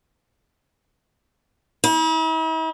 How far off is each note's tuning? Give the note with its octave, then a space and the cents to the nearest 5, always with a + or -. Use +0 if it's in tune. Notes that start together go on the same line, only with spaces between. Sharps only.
E4 -45